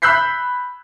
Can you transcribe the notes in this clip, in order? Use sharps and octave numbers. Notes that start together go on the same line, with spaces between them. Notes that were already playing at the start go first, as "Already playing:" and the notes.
B5 E6 F#6 G6 B6 C7